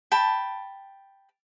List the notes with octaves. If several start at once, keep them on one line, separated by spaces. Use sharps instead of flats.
G5 A5 B5